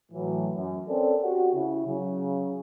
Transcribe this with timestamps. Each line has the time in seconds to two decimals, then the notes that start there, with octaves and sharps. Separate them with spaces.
0.12 A2 E3 F#3
0.56 F#2
0.89 C4 C#4 A4 A#4 C#5 D5
1.22 F#4 G4
1.55 C#3 E4
1.87 C#3 F#3